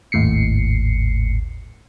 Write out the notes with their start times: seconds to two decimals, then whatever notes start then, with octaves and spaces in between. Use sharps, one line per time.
0.12 G#1 D#2 A2 C7 C#7